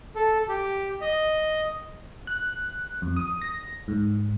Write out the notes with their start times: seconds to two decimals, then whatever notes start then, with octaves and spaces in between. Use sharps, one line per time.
0.15 A4
0.49 G4
1.01 D#5
2.27 F#6
3.02 F2
3.16 D#6
3.42 A#6
3.88 G#2